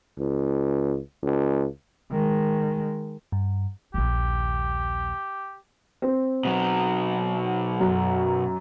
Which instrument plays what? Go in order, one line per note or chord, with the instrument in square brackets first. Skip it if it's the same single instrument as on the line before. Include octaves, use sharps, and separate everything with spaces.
[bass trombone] C#2
C#2
[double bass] D#3 G#3
[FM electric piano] G2
[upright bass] A#1 D#2 [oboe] G4
[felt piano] C4
[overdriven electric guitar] B2 F#3
[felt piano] F#2